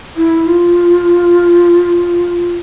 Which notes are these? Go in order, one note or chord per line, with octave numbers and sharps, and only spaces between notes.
E4
F4